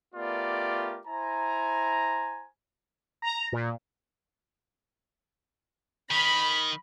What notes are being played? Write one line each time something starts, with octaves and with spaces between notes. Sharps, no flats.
A3 B3 F4 G4 A#4 D5
E4 C5 G#5 A#5
A#5
A#2
D#3 B5